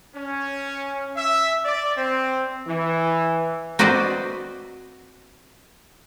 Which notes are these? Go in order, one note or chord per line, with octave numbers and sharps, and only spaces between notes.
C#4
E5
D5
C4
E3
C4 F#4 B4 C5 D5 D#5